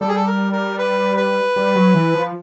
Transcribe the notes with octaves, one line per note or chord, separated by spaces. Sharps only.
G3 A4
G#4
A4
A#4
A#4
B4
B4
G3
F#3
E3
F3